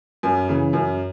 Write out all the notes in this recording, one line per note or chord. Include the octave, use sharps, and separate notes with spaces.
F#2
C#3 E3
F#2